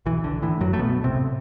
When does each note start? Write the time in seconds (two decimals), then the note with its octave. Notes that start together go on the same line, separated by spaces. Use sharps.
0.06 B1 E3
0.24 D3
0.42 A2 E3
0.61 F#2 F#3
0.73 A3
0.79 B1 B2 B3
1.04 C3 C4
1.16 A2